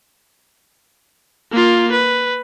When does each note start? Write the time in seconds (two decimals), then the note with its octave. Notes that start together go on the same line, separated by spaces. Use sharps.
1.51 A#3 F4
1.92 B4